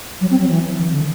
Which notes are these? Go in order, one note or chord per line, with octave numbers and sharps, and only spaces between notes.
F#3
C4
F#3
E3
E3
D3